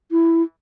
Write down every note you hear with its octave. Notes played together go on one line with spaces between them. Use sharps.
E4